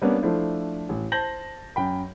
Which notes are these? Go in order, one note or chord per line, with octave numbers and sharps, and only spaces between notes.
G3 A#3 B3 C#4 D4
F3 A3 D4 E4 C5
A1
C5 A5 G6 A#6 F#7
F#2 G5 B5